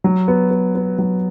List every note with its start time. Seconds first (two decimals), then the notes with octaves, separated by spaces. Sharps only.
0.04 F#3
0.28 B3
0.51 B3
0.75 B3
0.98 F#3